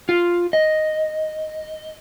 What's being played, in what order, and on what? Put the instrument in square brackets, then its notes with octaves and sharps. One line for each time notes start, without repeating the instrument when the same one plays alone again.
[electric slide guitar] F4
D#5